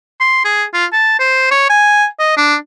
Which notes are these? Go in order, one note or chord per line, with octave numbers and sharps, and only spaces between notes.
C6
G#4
F4
A5
C5
C#5
G#5
D#5
D4